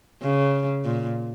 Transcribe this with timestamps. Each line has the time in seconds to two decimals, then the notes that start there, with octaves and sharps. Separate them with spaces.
0.23 C#3
0.84 A#2